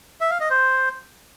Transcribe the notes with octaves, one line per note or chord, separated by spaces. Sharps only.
E5
F5
D#5
C5